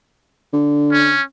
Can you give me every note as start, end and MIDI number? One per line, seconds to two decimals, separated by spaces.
0.53 1.16 50
0.93 1.23 61